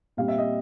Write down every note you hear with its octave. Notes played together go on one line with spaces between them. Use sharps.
A#2 G3 C4 F5
E5
D#5